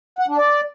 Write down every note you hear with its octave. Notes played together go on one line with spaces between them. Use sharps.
F#5
D4
D5